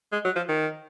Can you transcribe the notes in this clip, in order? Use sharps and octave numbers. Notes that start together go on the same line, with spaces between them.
G#3
F#3
F3
D#3